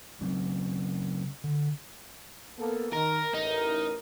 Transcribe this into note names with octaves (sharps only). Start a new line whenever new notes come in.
C#3 F#3 C4 C#4
D3
A#3 B3 A4
D#3 A#4
A1 D#4 A#4